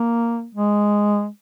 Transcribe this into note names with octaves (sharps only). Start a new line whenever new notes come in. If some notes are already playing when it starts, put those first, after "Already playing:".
Already playing: A#3
G#3